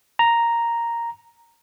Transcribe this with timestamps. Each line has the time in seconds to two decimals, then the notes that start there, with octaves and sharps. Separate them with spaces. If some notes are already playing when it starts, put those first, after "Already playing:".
0.19 A#5